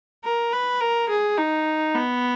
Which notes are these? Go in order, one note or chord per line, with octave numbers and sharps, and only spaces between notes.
A#4
B4
A#4
G#4
D#4
B3